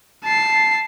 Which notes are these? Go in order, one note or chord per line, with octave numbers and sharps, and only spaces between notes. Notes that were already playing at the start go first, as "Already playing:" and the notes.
A5 C7